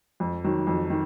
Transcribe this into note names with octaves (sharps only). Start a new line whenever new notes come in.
F2
D#3 F#3
F2
D#3